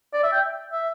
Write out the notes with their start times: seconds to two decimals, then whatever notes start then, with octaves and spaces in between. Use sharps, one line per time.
0.13 D5
0.24 E5
0.32 G5
0.73 E5